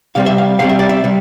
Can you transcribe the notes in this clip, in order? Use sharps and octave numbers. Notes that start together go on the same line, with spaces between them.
C3 G3 C4 F5
E5
F5
C3 G3 C4 F5
E5
D5
E5
C3 G3